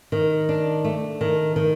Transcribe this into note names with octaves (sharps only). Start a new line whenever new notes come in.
D#3
D4
A3
D#3
D#3